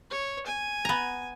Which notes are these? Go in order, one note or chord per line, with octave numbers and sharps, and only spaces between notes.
C#5
G#5
B3 A#5